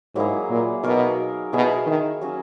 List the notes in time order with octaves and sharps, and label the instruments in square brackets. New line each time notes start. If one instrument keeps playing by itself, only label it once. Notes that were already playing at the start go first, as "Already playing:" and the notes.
[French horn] G#2 [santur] F#3 A#3 E4 G#4
[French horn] A#2
[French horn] B2 [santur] D#4 A#4 C#5
[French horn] B2 [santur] E4 G#4 C#5 E5
[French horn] D#3
[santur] F#3 C#4 F#4